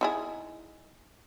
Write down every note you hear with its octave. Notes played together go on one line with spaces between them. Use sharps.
D#4 E4 G#4